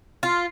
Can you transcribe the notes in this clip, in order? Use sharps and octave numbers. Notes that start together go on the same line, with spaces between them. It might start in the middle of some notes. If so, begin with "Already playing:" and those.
F4